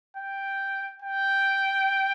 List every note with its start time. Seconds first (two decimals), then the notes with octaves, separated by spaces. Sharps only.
0.17 G5
1.02 G5